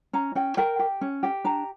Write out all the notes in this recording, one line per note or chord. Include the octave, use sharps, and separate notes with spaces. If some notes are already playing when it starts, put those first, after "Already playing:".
C#4 A#5
C#4 G5
A#4 G5
G4
C#4
G4 G5
D4 A#5